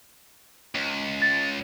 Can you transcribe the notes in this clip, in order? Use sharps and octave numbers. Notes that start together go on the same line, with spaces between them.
C#2
A6